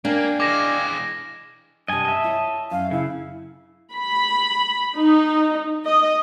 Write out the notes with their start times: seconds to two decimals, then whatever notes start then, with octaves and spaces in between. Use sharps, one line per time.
0.05 A#3 D4 F5 G5 G#5
0.40 E3 G#3 D6 A#6 E7
1.88 G2 C3 D#5 G#5 A5
2.05 D#5 E5
2.24 E4 C#5
2.71 F#2 F5
2.91 C#3 E4
3.94 B5
4.96 D#4
5.84 D#5